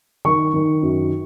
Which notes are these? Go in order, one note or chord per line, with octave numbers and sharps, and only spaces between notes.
D#3 C#6
D#3
F#2